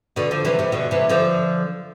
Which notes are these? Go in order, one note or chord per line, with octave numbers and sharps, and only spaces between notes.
B2 D3
D3 F3
C3 E3
C3 E3
B2 D3
C3 E3
D3 F3